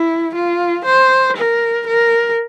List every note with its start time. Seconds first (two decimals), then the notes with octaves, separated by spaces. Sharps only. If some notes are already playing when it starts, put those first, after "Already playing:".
Already playing: E4
0.35 F4
0.85 C5
1.37 A#4
1.87 A#4